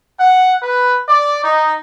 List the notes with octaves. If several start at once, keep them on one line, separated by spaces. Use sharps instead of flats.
F#5
B4
D5
D#4